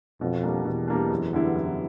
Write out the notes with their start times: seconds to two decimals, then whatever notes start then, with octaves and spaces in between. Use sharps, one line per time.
0.21 F2 B2
0.43 G3 A#3 D4
0.65 E2 B2
0.88 G3 A#3 D4
1.10 F#2
1.33 D3 G3 B3 E4
1.56 F#2